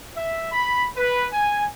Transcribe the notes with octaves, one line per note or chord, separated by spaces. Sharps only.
E5
B5
B4
G#5